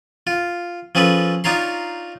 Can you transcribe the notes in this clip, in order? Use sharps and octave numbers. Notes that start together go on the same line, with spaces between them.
F4
F3 C#4 G#4 A4 B4
D4 D#4 F4 C#5 A#5 C6